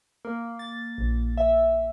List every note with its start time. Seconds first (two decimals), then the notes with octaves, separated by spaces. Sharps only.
0.25 A#3
0.59 A6
0.98 A#1
1.38 E5